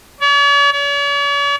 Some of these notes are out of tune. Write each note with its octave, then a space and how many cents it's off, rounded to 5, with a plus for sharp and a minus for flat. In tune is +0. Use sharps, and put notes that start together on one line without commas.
C#5 +45
C#5 +45